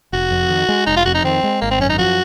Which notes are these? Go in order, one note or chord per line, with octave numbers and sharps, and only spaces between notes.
F1 F#4
F2
D#3
G#3
F1 D#4
F4
F2 F#4
D#4
D#3 C4
G#3
G#1 A#3
C4
F#2 C#4
D#4
F3 F#4